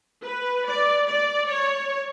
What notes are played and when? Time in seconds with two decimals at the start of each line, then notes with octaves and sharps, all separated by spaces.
0.24 B4
0.67 D5
1.08 D5
1.50 C#5